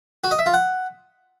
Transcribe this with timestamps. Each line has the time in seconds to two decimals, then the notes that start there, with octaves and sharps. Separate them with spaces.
0.24 F#4
0.31 D#5
0.39 E5
0.46 F4
0.54 F#5